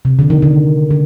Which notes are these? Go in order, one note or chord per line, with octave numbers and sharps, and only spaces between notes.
C3
D3
D#3
D3
D3